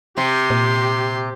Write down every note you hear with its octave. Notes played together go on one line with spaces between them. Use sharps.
C3 G4 C6
A#2